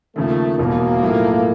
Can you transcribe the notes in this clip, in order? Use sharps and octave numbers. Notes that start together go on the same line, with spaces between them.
D#2 C#3 F3 A3 A#3
E1 E2 B2 A#3
B1 A2 F3 A3